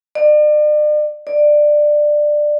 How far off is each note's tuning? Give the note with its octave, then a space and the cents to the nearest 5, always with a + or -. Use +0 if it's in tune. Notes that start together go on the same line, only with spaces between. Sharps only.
D5 +40
D5 +15